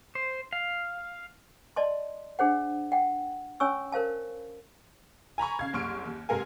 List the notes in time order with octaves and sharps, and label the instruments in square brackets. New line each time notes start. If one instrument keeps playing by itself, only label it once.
[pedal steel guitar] C5
F5
[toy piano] D5 D#5 A5 C6
D4 G#4 C5 F#5
F#5 G5
C#4 C#5 G#5 C#6 E6
A#4 C5 F5 A5
[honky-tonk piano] G#5 A#5 B5 C#6
C#3 F5 G#6
F#1 C2 C6 C#6 F6 D7
D#2
G#2 C3 A4 A#4 F5 G#5